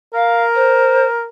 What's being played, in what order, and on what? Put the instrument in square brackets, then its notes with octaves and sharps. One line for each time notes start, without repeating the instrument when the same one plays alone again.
[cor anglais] A#4 [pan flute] F5
[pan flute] C5